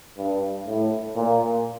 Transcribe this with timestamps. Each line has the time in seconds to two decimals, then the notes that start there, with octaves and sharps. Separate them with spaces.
0.18 G2
0.67 A2
1.15 A#2